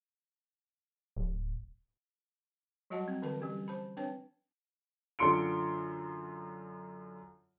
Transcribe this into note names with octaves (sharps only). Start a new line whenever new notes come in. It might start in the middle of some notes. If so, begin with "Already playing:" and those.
D1
F#3 G3 F#4 D#5 F#5 A5
C4
D3 E3 A#4 B4 A5
G3 C#4 G4
C5 A5 B5
C4 D4 B4 C#5 G5 A5
F#2 D3 F4 C6 C#7 D7